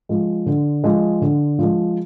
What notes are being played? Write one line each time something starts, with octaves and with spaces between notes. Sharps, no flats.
F3 G#3
D3
F3 G#3
D3
F3 G#3